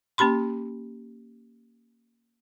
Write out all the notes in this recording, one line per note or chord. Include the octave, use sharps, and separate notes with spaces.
A#3 C#4 G4 B5 C6